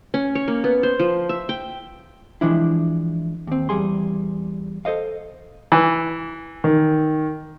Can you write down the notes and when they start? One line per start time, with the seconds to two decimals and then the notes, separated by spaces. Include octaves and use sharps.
0.14 C#4
0.35 C#5
0.48 A#3
0.64 B3
0.83 C5
0.99 F3
1.29 E5
1.49 G5
2.41 E3 F3 G#3 D4 E4
3.47 D#2 C4
3.69 E2 G3 G#4 C6
4.85 A4 C5 D#5 F5
5.72 E3
6.64 D#3